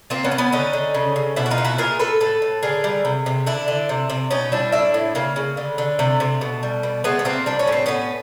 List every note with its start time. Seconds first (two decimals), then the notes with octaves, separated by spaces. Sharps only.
0.10 A#2 A#3 C4
0.24 B3 C#4
0.32 A#2
0.38 B3 C#4
0.52 D3 C#4 D#4
0.73 D3
0.94 C#3
1.16 C#3
1.36 B2 D4 E4
1.46 F#4
1.51 D#4 F4
1.58 B2
1.65 E4 F#4
1.78 A#2 G#4 A#4
1.99 A#2 A4 B4
2.20 A2 A4 B4
2.42 A2
2.63 D3 G#4 A#4
2.84 G3
3.05 C3
3.26 C3
3.46 D3 D4 E4
3.68 D3
3.89 C3
4.10 C3
4.31 B2 C#4 D#4
4.52 G3 D4 E4
4.72 A2 D4 E4
4.94 A2
5.15 C#3 A#3
5.36 C#3
5.57 D3
5.78 D3
5.99 C3 A3
6.20 C3
6.41 B2
6.63 G3
6.83 B2
7.04 G#3 A3 B3
7.19 B3
7.25 A#2 A#3 C4
7.46 G3 D4
7.59 C#4
7.67 A2 C4
7.86 A2 B3 C#4